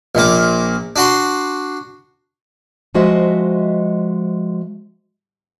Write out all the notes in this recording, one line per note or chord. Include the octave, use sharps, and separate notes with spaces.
A#1 A#2 A#3 D6
D4 F#4 C6
F3 G#3 F#4 C5 D#5 E5